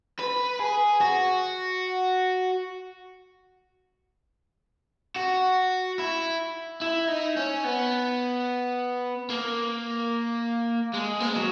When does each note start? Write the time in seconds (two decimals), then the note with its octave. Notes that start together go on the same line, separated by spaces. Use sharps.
0.20 B4
0.60 G#4
1.01 F#4
5.16 F#4
5.99 E4
6.82 E4
7.08 D#4
7.37 C#4
7.64 B3
9.30 A#3
10.94 G#3
11.20 A#3
11.29 G#3
11.36 F#3